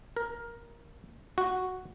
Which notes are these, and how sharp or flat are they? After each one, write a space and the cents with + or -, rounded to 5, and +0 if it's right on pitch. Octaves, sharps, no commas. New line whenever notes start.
A#4 +10
F#4 -5